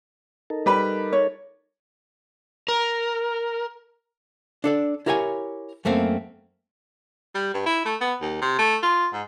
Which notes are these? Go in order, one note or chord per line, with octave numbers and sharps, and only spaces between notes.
D#4 A4 A#4
G3 B4 B5
C#5
A#4
D4 A4 D5
E4 G4 A#4 C#5 F5 G#5
F#2 A3 A#3 C4
G3
G2
E4
A3
B3
D#2
C3
A3
F4
G#2